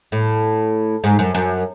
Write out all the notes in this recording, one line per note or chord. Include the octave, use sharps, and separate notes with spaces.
A2
G#2
F#2
F#2